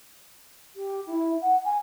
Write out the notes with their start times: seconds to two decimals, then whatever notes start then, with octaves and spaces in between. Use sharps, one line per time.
0.76 G4
1.07 E4
1.42 F#5
1.65 G#5